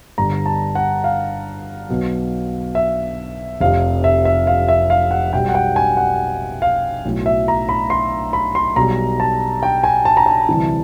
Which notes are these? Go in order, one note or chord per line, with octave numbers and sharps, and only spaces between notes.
G1 G2 D3 A#5
A5
F#5
F5
B1 B2 F#3
E5
F1 F2 C3 F5
E5
E5
F5
E5
F5
F#5
B1 B2 G3 G5
F#5
G5
G#5
F#5
F5
B1 A2 F#3
E5
A#5
B5
C6
B5
C6
B1 B2 G3 A#5
A5
G5
G#5
A5
A#5
A5
D2 C3 E3 G3